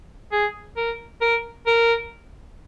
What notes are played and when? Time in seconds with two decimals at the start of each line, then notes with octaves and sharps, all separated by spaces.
0.32 G#4
0.77 A#4
1.21 A#4
1.67 A#4